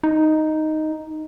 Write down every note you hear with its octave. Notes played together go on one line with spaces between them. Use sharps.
D#4